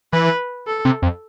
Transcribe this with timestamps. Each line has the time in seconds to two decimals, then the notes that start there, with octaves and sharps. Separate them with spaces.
0.13 E3 B4
0.67 A4
0.85 C3
1.02 F2